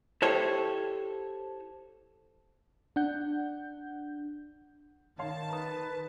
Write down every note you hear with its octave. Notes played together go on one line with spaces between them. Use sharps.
E4 G4 A4 C5 C#5
D4 F#5 G6
D#3 C#5 F5 A5 C6
B4 A#5 D#6